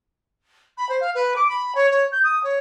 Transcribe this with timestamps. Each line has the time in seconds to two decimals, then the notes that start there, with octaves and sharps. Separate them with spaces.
0.77 B5
0.89 C5
1.00 F5
1.14 B4
1.36 D6
1.48 B5
1.75 C#5
1.90 C#5
2.12 G6
2.23 D#6
2.43 C#5